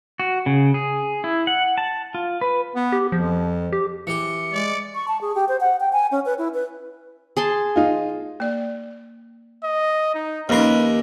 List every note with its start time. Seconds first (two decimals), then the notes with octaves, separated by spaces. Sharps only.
0.20 F#4
0.46 C#3
0.74 G#4
1.24 E4
1.47 F#5
1.78 A5
2.14 F4
2.41 B4
2.76 B3
2.92 G4
3.12 F2 F3
3.72 G4
4.07 E3 G4 C#7
4.53 G#3 D5
4.95 C#6
5.08 A5
5.21 G#4
5.35 G4
5.49 C5
5.61 F#5
5.80 G5
5.93 G#5
6.11 C#4
6.26 B4
6.38 E4
6.54 B4
7.37 G#4 A5 C6
7.76 D#4 F4
8.40 A#3 D5
9.63 D#5
10.15 D#4
10.49 D#2 F3 C#4 D#4 A#4 B4